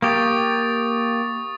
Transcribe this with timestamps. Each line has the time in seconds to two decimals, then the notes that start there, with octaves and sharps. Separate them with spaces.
0.02 A#3 G4 C#6 D#6 A6